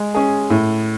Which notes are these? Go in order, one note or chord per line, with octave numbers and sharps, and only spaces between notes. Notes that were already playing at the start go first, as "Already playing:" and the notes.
Already playing: G#3
C#4 G#4
A2